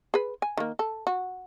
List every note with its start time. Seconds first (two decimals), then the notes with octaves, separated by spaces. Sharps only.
0.14 G#4 B4
0.42 G#5
0.57 D#3 A#3
0.79 A4
1.07 F#4